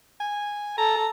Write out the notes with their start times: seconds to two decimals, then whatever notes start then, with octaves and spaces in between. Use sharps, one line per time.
0.20 G#5
0.78 A4 A#5